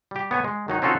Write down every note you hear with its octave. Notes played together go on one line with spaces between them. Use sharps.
G3 G4
B3 C#5 G#5
G#3
D#3 F#3 D#4
C4 C#4 D#4 F4 F#4 A4